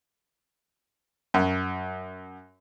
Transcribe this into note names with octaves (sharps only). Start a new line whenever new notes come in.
F#2